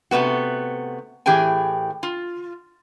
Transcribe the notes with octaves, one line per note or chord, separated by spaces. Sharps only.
C3 A3 B3 F#4
A2 E3 G4 G#4 G5 G#5
F4